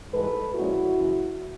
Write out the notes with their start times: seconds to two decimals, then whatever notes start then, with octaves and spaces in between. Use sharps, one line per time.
0.12 G#2 E3 G3 A4 B4
0.54 A#2 F3 G#3 C#4 E4 F#4
0.97 F#2 C#3 E3